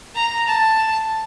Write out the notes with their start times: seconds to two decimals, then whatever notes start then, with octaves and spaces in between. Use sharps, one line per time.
0.15 A#5
0.48 A5